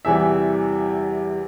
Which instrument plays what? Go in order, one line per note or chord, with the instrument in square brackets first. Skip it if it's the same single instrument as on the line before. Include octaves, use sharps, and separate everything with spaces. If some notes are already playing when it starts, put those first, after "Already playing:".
[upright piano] E2 C3 E3 G3 E5